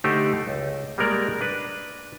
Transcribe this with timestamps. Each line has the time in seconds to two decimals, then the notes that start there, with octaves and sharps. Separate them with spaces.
0.04 D3 A3 D#4 G4 C5
0.48 C#2
0.98 G3 G#3 A#3 A#4 D5
1.41 D4 B4